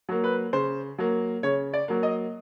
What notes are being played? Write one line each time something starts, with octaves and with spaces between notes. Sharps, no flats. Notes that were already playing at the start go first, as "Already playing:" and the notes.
F#3 A#3
B4
C#3 C5
F#3 A#3
C#3 C#5
D5
F#3 A#3
D#5